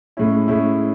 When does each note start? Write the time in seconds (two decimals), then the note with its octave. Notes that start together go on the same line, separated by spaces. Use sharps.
0.17 A2 G#3 C#4 E4
0.48 A2 G#3 C#4 E4